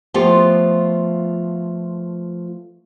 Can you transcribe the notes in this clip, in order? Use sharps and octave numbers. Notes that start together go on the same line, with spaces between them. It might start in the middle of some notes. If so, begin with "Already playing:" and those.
F3 A3 B3 F4 G4